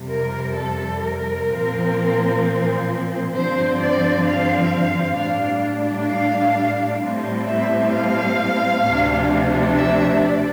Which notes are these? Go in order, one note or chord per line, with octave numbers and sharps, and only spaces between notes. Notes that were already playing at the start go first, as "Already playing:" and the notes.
Already playing: F2 C3 G3
A#4
A4
A#4
A#2 F3 C4
G2 D3 F3 C4 C5
D5
F5
A2 G3 D4 F5
F5
A2 G3 C4
E5
F5
D2 C3 F3 A3 D4
E5
D5